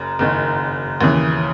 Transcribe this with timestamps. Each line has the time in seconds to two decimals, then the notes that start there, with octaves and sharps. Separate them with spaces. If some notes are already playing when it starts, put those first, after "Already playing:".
Already playing: F#1 F#2
0.19 F#1 F#2 D#3
1.01 D#2 C#3 E3